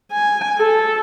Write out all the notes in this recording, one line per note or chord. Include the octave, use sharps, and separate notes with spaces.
G#5
A4